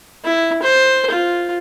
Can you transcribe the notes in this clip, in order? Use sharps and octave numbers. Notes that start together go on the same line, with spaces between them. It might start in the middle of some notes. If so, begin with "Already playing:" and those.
E4
C5
F4